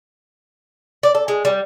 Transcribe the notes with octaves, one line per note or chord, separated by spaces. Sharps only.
D5
A4
G#3
G3